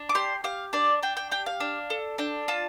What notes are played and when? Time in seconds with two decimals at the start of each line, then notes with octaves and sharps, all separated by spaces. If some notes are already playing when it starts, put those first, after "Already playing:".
Already playing: D4
0.09 D6
0.15 G4 C6
0.44 G4 F5
0.73 D4 D5
1.03 D4 G5
1.17 G5
1.31 G4 G5
1.46 F5
1.60 D4
1.90 A4
2.18 D4 G5
2.48 F4 A5